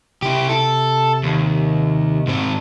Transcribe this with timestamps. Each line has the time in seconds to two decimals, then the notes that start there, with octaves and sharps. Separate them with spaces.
0.22 C3 E4 G4
0.49 A4
1.23 D#2
2.27 G#2 C4